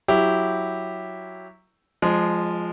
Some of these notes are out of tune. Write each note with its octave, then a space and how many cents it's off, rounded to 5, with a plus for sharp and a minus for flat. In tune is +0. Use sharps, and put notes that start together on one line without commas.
F#3 +0 E4 +0 G4 +0
F3 +0 G#3 +0 D#5 -35